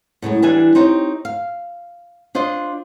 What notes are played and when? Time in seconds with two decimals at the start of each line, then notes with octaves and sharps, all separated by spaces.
0.22 A2 C#3 F#3 G#3
0.42 E3 G3 D4 G#5
0.75 C4 D#4 G4 C#5
1.25 F5
2.35 D4 F4 C5 D5 D#5